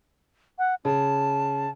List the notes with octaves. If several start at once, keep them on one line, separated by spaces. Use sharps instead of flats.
F#5
C#3 A5